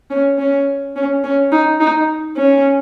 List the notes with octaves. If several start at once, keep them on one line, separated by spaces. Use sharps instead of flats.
C#4
C#4
C#4
C#4
D#4
D#4
C#4